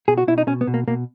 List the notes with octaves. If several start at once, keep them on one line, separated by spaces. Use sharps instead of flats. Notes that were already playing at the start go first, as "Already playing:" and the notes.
B2 G#4
F#4
B2 E4
D#4
B2 C#4
B3
B2
A#3
B2 A#3